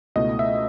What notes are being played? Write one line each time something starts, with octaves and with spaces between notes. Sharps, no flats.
C#2 B2 A3 E4 D#5
E5